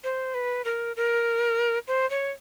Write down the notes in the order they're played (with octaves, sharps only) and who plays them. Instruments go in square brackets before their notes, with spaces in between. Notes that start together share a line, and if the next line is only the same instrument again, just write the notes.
[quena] C5
B4
A#4
A#4
C5
C#5